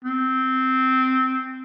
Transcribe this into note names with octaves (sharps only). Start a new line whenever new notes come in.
C4